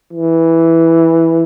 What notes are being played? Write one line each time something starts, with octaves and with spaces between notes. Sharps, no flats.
E3